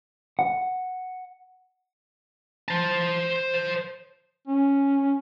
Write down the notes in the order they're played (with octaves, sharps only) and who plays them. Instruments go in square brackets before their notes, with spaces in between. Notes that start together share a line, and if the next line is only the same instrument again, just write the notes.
[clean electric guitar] F#5
[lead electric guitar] C5 A5
[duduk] C#4